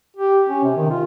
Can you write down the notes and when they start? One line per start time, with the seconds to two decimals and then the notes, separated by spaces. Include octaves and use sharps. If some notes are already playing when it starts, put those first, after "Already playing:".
0.17 G4
0.49 C#4
0.63 C3
0.77 D#3
0.91 F4